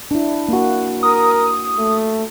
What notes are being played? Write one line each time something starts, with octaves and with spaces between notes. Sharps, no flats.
D4 E4
A#3 F#4
A#4 D#6
A3